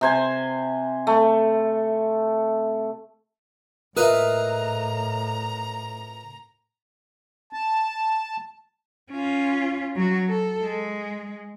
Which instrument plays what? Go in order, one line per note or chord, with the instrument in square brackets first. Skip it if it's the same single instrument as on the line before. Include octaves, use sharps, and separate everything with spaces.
[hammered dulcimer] C3 C5 G#5
A3
[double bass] A2 [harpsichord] F4 B4 D#5 [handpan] A#4 E5 [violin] A#5
[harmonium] A5
[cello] C#4 F4
F#3 F#4
A4
G#3